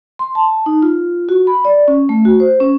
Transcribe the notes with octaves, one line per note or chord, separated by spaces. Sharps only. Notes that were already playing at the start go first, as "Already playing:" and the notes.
C6
A5
D#4
F4
F#4
B5
D5
C#4
A3
F#4
C5
C#4